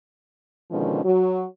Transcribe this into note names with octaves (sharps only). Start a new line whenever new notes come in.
B2 D3 D#3 F3 G#3 C#4
F#3 F#4